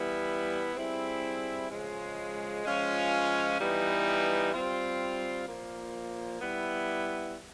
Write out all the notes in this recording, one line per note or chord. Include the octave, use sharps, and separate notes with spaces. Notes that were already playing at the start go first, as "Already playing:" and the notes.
Already playing: E3 G3 B3 E4
G3 C4 E4 G#4
C#3 F3 G#3
F3 G#3 C#4 F4
E3 G3 B3 D#4
G3 C4 F4
A#2 F3 A#3
G3 B3 E4